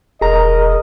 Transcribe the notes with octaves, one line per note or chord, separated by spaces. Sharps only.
E1 G#4 A#4 D#5 A#5